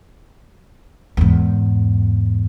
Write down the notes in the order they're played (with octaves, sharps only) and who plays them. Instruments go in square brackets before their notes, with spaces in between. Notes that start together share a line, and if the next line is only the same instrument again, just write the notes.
[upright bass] E2 G#2